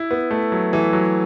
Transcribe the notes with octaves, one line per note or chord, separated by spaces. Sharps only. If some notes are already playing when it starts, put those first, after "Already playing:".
Already playing: E4
B3
A3
F#3
E3
F#3